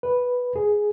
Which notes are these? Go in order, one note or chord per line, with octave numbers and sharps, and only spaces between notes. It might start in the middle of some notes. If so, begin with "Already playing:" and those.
B4
G#4